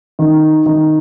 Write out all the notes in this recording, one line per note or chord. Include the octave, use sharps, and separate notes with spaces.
D#3
D#3